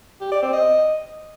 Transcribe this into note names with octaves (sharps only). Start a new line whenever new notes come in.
G4
D5
C4
D#5